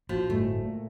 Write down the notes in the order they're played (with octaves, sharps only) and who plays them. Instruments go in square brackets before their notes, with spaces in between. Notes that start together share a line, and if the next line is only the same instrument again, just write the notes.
[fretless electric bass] A#1 [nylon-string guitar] F3 [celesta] F#4 C5
[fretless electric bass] G1 A2 G#3 [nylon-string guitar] A3
[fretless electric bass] A#2